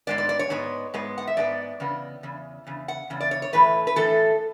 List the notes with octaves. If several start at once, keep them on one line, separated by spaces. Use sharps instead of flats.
G#2 G#3 B3 D5
D5
D5
C#5
G#2 G#3 B3
G#2 G#3 B3
F#5
E5
G#2 G#3 B3 D5
E2 C#3 B3
E2 C#3
E2 C#3
F#5
E2 C#3
D5
C#5
C#5
A2 E3 A3 B4
B4
A2 E3 A3 A4